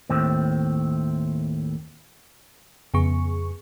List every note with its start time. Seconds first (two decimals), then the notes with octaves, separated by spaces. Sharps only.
0.09 D#2 A2 C4
2.94 F2 C#3 B3 G#4 C#6